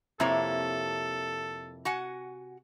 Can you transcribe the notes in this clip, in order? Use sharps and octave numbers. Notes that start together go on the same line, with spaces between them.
F2 C3 A#3 E4 A4 C#5
F#4 F#5 G#5